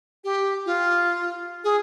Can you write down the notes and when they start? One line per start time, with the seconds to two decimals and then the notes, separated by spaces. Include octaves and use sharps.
0.24 G4
0.66 F4
1.64 G#4